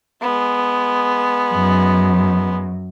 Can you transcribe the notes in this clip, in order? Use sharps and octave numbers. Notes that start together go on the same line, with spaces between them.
G#3 B3
F#2